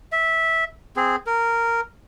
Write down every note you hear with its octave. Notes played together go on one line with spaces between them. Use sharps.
E5
C4 G#4
A#4